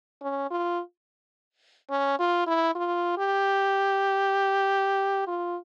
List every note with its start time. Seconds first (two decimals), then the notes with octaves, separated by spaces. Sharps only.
0.22 C#4
0.51 F4
1.90 C#4
2.19 F4
2.47 E4
2.75 F4
3.18 G4
5.27 F4